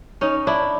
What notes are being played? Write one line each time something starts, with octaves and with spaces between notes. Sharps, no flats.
C#4 D#4
D4 E4